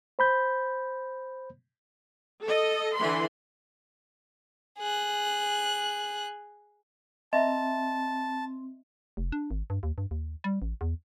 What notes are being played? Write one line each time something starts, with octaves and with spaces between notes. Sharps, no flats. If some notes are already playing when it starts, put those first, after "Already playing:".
C5 B5 G6
A4 D#5
D3 E3 B5 C6
G#4 F#6
C4 D#5 E5 A5 A#5
F1
D4
G#1
G2
D#2
G2
D#2
G3
A1
E2